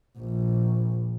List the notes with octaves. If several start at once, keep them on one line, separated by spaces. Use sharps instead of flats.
A#1